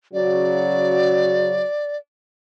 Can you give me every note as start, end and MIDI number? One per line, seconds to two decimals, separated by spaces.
0.14 1.61 49
0.14 1.61 54
0.14 1.61 66
0.14 1.97 74